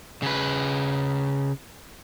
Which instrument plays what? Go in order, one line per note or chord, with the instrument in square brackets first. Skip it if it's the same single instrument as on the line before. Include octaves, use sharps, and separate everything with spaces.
[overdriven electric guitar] C#3 B4